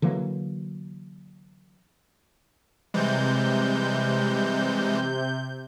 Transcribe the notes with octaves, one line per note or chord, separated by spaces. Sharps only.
D3 E3 F#3 A#3
C3 E3 G3 G#3 G6